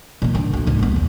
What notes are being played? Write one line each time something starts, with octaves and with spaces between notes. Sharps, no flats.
A#2 A3
G#2 D3
D2 F3
C2 G#2
B3 E4
A#1 E2